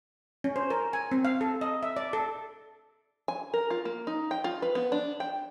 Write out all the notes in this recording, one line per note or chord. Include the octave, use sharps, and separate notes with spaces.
C#4
C5
A#4
G#5
C4
F5
A4
D#5
E5
D5
A4
G#5
A#4
F4
A#3
D#4
G5
F4
B4
B3
D4
G5